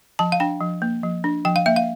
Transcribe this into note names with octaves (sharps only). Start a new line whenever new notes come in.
F3 A5
F5
D4 G5
F3
A#3
F3
D4
F3 G5
F5
A#3 E5
F5